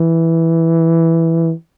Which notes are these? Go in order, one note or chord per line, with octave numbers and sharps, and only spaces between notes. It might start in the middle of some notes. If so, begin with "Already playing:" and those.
Already playing: E3